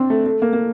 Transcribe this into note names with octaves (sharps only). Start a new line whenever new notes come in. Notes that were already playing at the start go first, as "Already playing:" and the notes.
Already playing: C4 D4
A3
A3
A#3
A#3